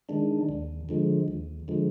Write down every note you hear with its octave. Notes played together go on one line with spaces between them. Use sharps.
D#3 G#3 D4
D#2
D3 F3 G#3
D#2
D3 F3 G#3